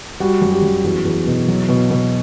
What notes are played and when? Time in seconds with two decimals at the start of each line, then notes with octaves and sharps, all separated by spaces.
0.20 G3 F#4
0.41 F#2
0.52 G4
0.62 F#2
0.83 E2 F#4
1.05 E2
1.27 B2
1.48 F#3
1.69 B2
1.91 B2